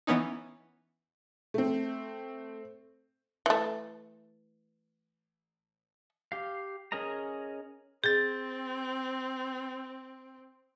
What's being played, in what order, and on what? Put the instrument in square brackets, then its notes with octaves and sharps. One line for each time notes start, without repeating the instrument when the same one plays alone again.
[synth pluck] E3 B3 C#4 D#4
[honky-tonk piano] A3 C4
[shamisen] E3 A3
[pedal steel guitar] G4 F5
C#4 G#4 A#4 D#5 A#5
[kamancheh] C4 [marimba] G#4 [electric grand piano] G6 A6